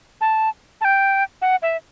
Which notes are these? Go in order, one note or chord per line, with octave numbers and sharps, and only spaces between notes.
A5
A5
G5
F#5
E5